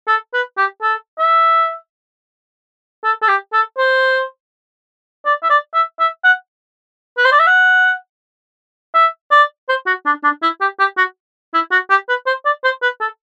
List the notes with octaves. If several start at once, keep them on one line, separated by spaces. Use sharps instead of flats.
A4
B4
G4
A4
E5
A4
A4
G4
A4
C5
D5
E5
D5
E5
E5
F#5
B4
C5
D5
E5
F#5
E5
D5
C5
F#4
D4
D4
E4
G4
G4
F#4
E4
F#4
G4
B4
C5
D5
C5
B4
A4